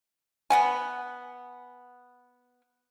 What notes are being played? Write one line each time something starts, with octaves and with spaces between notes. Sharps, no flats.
B3 F#5 G#5